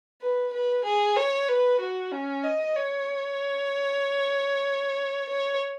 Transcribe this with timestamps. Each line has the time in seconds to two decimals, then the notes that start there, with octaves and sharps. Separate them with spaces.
0.22 B4
0.54 B4
0.85 G#4
1.16 C#5
1.48 B4
1.80 F#4
2.12 C#4
2.44 D#5
2.76 C#5
5.29 C#5